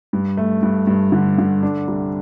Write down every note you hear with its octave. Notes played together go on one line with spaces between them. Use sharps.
G2
A3
G2
G2
D3
D3
D4
C2